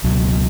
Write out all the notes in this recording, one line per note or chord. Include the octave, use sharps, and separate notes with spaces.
C#2 B2 F#3